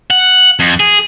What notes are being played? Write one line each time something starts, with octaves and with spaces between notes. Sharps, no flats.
F#5
F2
G#4